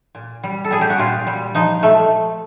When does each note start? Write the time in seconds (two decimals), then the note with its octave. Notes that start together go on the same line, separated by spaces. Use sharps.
0.15 A#2
0.43 G3
0.64 A4
0.71 G3 G#4
0.81 G4
0.90 F#4
0.98 A#2 F4
1.27 G3
1.55 F3 D#4
1.83 A3